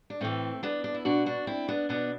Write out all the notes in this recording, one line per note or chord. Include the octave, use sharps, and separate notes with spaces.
D4
A2 E3 A3 C4
B3 D4
D4
E4
B2 D4 F#4
D4 F#4
C4 E4
B3 D4
B2 B3 D4